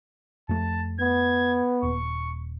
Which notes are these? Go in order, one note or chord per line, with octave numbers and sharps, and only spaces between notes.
F2 A3 A5
B3 G#6
D#1 C#6